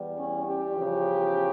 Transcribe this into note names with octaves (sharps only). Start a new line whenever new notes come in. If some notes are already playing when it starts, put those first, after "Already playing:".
Already playing: E2 E3 G3
C#4
G4
E2 C#3 F3